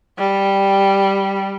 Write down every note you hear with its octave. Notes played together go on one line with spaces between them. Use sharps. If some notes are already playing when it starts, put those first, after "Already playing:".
G3